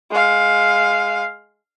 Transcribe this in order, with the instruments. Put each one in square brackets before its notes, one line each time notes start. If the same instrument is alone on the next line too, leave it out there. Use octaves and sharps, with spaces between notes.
[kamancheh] G#3 F5